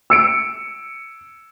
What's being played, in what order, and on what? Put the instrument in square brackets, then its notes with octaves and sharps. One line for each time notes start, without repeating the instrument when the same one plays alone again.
[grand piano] E6 C#7 D7